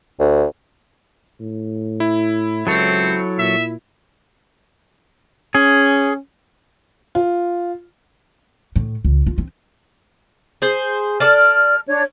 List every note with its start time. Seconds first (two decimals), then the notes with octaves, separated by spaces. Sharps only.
0.20 D2
1.40 A2
2.00 E4
2.67 C#2 F#3 C4 A4 C#5
3.38 A#2 E5
5.55 C#4 G#4
7.15 F4
8.76 A2
9.05 C#2
9.26 F4
9.38 C4
10.62 G#4 C5
11.20 A4 D5 A5 F6
11.88 D4 C#5